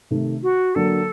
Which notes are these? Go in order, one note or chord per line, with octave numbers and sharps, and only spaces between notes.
C3 D#3 A3
F#4
D3 F#3 A#3 A4